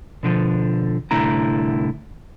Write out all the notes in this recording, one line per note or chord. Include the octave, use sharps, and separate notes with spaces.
B2 D3 F3
C2 A2 D3 E4 A#5